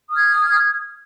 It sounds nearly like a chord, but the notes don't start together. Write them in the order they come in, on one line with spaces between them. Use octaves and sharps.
D#6 F6 G#6